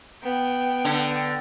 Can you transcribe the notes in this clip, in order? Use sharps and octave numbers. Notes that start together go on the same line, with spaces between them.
B3 G5
D3